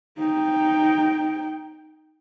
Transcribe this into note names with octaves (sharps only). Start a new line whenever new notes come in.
D#4 G5